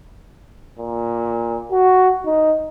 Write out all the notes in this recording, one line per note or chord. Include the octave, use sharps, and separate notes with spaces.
A#2
F#4
D#4